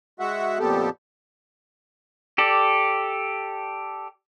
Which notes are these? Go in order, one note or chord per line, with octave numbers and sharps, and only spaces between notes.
G#3 F#4 E5 F#5
F2 A#2 B3 G4 A4
G4 A4 D5